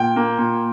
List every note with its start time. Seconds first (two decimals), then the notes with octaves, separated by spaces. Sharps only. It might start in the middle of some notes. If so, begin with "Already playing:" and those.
Already playing: A#2 G5
0.16 A#3
0.38 A#2